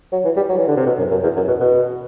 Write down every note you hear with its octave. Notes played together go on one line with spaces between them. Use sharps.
F#3
E3
G3
F#3
E3
D3
C3
B2
F#2
F#2
E2
F#2
B2
B2